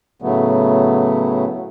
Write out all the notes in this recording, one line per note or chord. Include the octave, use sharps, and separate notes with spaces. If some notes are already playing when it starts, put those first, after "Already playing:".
A2 C#3 F#3 A3 B3